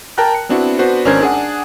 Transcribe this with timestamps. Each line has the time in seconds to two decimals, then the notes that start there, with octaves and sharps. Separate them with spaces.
0.18 A#4 G5 A5 A#5 F#6
0.35 C#7
0.49 B3 C4 D4 E4 F#4
0.79 B3 D4 F#4 B4 C5
1.05 G#1 C#4 D4 A#4 C5 G#6
1.21 D4 G#4 F#5